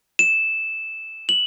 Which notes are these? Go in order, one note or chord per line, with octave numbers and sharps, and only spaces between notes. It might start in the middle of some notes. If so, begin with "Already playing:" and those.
E7
F#7